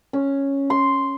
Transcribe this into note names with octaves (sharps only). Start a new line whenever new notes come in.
C#4
C6